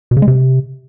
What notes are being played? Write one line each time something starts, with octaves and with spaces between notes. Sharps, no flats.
B2
C#3
G#3
C3